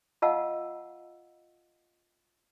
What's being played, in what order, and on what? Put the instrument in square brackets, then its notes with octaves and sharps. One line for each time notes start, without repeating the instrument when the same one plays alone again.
[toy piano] F4 D#5 F5 F#5 A5 E6